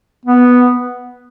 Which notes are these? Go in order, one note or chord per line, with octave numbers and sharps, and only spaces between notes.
B3